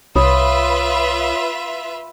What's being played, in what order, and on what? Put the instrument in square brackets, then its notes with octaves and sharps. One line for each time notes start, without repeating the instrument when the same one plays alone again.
[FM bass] C2 [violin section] F4 B4 E5 [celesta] C#5 B5 D#6